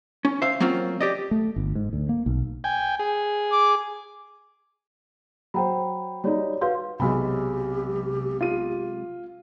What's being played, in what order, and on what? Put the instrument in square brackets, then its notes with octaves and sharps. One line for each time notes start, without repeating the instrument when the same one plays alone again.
[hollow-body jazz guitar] C#4
C5 E5 F5
F#3 A#3 C4 C#4 F4
G4 D5 D#5
[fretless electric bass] A3
G1
G#2
D2
A#3
B1
[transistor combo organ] G5 G#5
G#4
[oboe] D6
[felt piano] F#3 C5 [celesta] G5 A#5 B5
[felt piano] G3 D#4 [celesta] F#4 C#5 D5
[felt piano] F#4 G6 [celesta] B4 F5 C6
[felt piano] B1 B5 [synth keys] C3 F#3 G#3 [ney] G4
[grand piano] F4 D#7